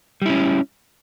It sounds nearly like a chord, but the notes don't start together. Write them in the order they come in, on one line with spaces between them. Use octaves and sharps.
G3 E4 C#4